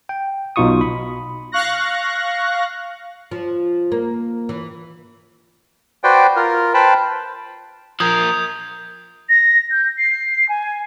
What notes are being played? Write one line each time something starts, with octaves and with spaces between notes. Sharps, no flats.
G5
B1 B2 D#4 F4 C#6 D#6
B5
F5 C#6 F#6 A#6
F3
A#3
E3
F#4 B4 C5 D5 G5
F4 A#4
B4 C5 G5 A5 B5
F3 A#4 D#6 G6 G#6
A#6
G6
C7
G#5